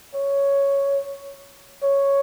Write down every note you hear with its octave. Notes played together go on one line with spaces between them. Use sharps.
C#5
C#5